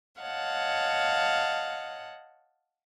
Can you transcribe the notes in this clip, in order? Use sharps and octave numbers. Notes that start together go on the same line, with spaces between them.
C#5 D#5 F5 F#5 A5